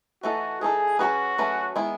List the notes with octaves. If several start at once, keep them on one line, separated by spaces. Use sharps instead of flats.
E3 A3 D#4 F#4 A4
E3 A3 D#4 G#4 A4
F#3 A3 C#4 F#4 G#4 B4
F#3 A3 C#4 G#4 B4
D#3 G#3 B3 E4